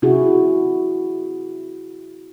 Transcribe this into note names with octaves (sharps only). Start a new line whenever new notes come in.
C3 E4 F#4 G#4